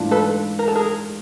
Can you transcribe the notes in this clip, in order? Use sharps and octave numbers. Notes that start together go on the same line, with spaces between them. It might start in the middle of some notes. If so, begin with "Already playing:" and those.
Already playing: G#2 E3 A3 D4 F4
A4 B4
A#4
A4
G#4 A#4